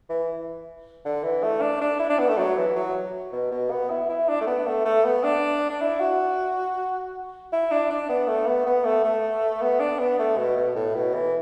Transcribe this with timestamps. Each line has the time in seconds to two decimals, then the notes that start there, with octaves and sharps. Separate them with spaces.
0.09 E3
1.05 D3
1.23 E3
1.43 A3
1.61 D4
1.81 D4
1.99 E4
2.09 D4
2.19 B3
2.28 A3
2.38 F#3
2.57 E3
2.76 F#3
3.33 B2
3.52 B2
3.71 B3
3.90 E4
4.09 E4
4.28 D4
4.41 A3
4.47 B3
4.66 A3
4.85 A3
5.04 B3
5.23 D4
5.69 D4
5.81 E4
6.00 F#4
7.52 E4
7.71 D4
7.90 D4
8.09 B3
8.28 A3
8.47 B3
8.66 B3
8.85 A3
9.04 A3
9.61 B3
9.80 D4
9.99 B3
10.19 A3
10.38 B2
10.57 B2
10.75 A2
10.95 B2
11.14 E3